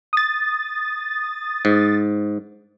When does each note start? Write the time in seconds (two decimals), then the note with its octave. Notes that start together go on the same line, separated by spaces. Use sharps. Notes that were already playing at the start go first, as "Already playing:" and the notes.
0.13 D#6 A6
1.65 G#2